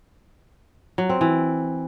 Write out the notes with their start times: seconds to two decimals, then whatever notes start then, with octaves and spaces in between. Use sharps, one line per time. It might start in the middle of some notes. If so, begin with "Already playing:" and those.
0.98 F#3
1.09 C4
1.21 E3